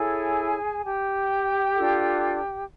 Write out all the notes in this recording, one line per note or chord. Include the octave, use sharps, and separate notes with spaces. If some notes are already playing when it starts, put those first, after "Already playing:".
Already playing: E4 G#4 A4 C#5 G#5
G4 G5
D4 F4 A4